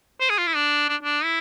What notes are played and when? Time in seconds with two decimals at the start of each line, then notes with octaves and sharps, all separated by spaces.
0.21 C5
0.30 G#4
0.38 F4
0.47 E4
0.56 D4
0.89 D4
1.03 D4
1.24 E4